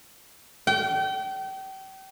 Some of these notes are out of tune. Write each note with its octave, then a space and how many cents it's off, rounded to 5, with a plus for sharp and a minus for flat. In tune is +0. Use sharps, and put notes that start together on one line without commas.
G5 -35